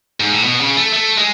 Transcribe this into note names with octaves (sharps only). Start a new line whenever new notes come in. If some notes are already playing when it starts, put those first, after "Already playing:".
G#2
A2
B2
C#3
A3
A3
G#3